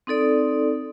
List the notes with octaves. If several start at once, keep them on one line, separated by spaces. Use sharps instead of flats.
C4 D#4 A4 D5